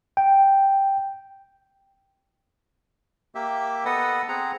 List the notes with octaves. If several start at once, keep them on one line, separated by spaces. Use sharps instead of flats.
G5
A#3 G4 E5
B3 A4 B4 D#5 F#5
C4 G#4 F#5 A#5